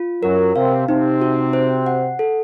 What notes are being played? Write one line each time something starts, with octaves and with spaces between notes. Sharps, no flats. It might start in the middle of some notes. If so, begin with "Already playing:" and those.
Already playing: F4
F#2 F#3 A#4
C3 C4 F5
C3 C4 D#4
F#4
C5
F#5
A4